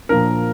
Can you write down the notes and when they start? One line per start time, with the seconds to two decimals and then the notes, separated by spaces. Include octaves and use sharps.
0.09 A#2 F3 A#3 D4 A#4